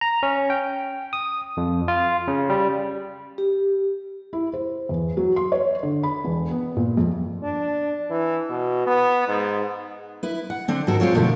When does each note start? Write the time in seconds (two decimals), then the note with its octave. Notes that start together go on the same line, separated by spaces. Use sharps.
0.01 A#5
0.23 C#4
0.50 G5
1.13 D#6
1.57 F2
1.88 F4
2.28 C#3
2.50 G3
3.38 G4
4.33 E4
4.53 C5
4.89 E2
5.17 F#3
5.36 C6
5.52 C#5
5.83 D3
6.03 B5
6.25 E1
6.51 B3
6.77 A#2
6.97 F2
7.43 D4
8.10 E3
8.50 B2
8.87 B3
9.28 G#2
10.23 E4 B4
10.50 F#5
10.68 D3 C4 D5
10.87 G#2 F#4 A4 A#4
11.00 G#3 C4 F4 C#5
11.14 F#2 B2 D3 F3 A3 E4